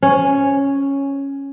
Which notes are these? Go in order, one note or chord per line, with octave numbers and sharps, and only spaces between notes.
C#4